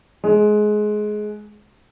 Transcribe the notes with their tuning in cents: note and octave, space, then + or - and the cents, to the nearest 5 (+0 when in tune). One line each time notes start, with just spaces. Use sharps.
G#3 +20